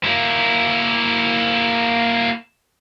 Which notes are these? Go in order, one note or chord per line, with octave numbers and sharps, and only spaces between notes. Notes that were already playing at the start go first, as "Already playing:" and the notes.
A#3 E4